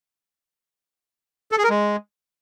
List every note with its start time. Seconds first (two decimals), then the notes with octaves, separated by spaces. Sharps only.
1.52 A4
1.58 G#4
1.64 A#4
1.70 G#3